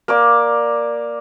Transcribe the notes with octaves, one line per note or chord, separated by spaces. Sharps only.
A#3 D5 D6